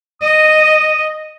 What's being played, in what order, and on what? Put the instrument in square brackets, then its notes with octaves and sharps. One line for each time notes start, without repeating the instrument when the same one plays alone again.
[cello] D#5 [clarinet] D#6